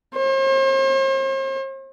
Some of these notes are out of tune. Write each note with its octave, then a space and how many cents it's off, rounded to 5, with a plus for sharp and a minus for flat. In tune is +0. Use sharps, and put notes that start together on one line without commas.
C5 +45